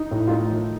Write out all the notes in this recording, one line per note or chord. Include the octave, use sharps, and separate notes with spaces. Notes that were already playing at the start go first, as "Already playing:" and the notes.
Already playing: D#4
A2
F4
A3 D#4
D#3